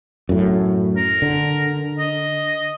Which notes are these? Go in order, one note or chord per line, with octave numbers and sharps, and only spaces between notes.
F#2 A2
A#4
D3
D#5